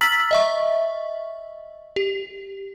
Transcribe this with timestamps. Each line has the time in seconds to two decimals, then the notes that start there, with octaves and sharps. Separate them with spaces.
0.01 A#5 E6 F6 A6 B6 F#7
0.31 D#5 E5 C#6
1.96 G4